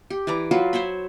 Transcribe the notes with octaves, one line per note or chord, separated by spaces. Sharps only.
G4
E3 B4 D5 A#5
F#3 F4 F#4 B4
C5 C#5 E5 B5